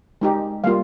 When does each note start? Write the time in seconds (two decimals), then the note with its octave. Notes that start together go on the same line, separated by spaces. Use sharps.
0.21 G#3 D#4 G4
0.64 G3 A#3 F4 F5